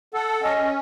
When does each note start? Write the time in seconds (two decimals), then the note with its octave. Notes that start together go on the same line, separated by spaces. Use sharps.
0.13 A4 F#5
0.43 C#4 D#5